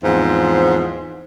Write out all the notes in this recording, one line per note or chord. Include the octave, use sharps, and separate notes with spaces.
E2 G#2 F3 C4